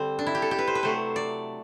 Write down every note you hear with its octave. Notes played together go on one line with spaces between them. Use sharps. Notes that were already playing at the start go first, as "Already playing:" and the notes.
Already playing: D3 G3 C4
D4
E4
G4
A4
G4
B4
C5
B4
C3 F#3 A3 C5
D5